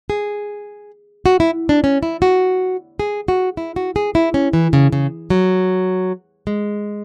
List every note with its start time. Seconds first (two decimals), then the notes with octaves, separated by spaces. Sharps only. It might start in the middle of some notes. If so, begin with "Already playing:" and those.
0.10 G#4
1.26 F#4
1.40 E4
1.69 D4
1.84 C#4
2.03 E4
2.22 F#4
3.00 G#4
3.28 F#4
3.57 E4
3.76 F#4
3.96 G#4
4.15 E4
4.34 C#4
4.53 E3
4.73 C#3
4.92 C#3
5.30 F#3
6.47 G#3